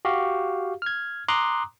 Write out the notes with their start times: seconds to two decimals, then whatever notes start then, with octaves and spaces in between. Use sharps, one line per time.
0.05 F#4 G4 F5
0.82 F6 G#6
1.28 A#5 C6 D6 D#6 F#6